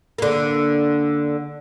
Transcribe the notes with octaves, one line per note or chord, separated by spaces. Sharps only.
D3 A#3